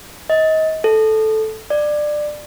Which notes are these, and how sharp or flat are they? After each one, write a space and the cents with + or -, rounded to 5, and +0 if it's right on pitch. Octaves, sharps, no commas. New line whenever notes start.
D#5 +25
A4 -10
D5 +20